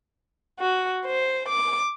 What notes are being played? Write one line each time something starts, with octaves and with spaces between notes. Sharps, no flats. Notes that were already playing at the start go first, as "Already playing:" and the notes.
F#4
C5
D6